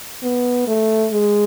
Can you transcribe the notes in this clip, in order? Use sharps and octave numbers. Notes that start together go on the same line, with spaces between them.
B3
A3
G#3